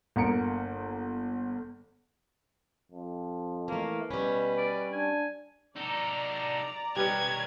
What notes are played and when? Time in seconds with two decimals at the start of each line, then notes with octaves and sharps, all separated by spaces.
0.16 G1 A#3 A#5 C#7 D7
2.92 F2
3.68 E3 A3 A#3
4.11 B2 G3 C#4 B4
4.58 D5
4.92 D4 G#5
5.76 D#4 A4 D5 A#5
6.96 B1 G3 C#4 B4 D#5 G#6